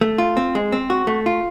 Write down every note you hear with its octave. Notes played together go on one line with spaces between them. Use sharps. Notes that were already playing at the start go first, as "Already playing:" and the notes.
A3
F4
C4
G#3
C4
F#4
A3
F4